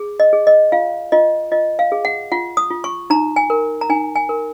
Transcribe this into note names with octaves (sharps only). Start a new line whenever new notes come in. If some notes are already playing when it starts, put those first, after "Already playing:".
Already playing: G#4
D#5
G#4
D#5
F4 F5
F4 D#5
F4 D#5
F5
G#4
F#5
F4 F#5
D#6
F4
C#6
D#4 A#5
G#5
A#4
A#5
D#4 G#5
G#5
A#4